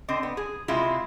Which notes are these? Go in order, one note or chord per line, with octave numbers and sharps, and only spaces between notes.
D3 C4 D#5
B3
G#4
C3 G#3 E4 F4